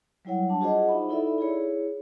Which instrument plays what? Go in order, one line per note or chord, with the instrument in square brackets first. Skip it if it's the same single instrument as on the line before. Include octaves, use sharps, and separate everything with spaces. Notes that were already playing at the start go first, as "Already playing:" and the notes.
[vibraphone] F#3 G3 E4 C#5 F#5
G3 D4 A5 D6
F4 F#4 G#4 C5 D#5 F#5
D#4 E5 B5
D#4 E4 A4 D5 E5 B5
E4 G#4 C#5